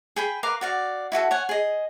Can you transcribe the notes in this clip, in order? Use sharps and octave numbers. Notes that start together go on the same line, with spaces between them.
G#4 G5 B5
A#4 B4 F5 D6
F#4 D5 F5
E4 F#4 G#4 A4
C#5 F#5 G#5
G#4 D#5